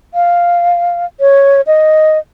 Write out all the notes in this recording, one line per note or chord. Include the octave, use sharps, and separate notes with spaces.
F5
C#5
D#5